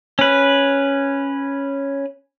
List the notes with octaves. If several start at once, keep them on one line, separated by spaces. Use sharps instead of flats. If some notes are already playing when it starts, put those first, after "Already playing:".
C#4 B4